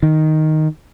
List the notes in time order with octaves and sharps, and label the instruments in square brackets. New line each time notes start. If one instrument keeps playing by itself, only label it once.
[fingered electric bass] D#3